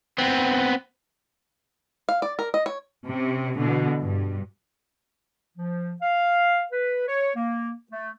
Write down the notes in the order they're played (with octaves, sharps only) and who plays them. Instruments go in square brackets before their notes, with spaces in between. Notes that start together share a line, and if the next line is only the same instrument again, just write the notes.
[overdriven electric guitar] B3 C4
[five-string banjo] F5
D5
A#4
D#5
C#5
[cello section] C3 C#4
B2 D3 E3
G2
[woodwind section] F3
F5
B4
C#5
A#3
A3